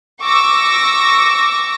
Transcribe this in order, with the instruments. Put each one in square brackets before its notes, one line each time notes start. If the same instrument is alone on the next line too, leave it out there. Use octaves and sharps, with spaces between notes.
[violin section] C#6 D6 E6 A#6